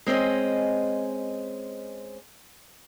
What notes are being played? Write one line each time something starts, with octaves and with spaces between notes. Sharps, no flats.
G#3 C4 C#4 D#5